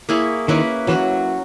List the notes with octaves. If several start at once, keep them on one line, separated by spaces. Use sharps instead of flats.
A#3 E4 G#4 C#5
D#3 A#3 C#4 E4 B4
E3 F#3 C#4 F#4